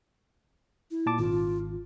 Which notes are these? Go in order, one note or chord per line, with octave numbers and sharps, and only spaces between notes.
E4
A#2 A5 D6
G#1 F4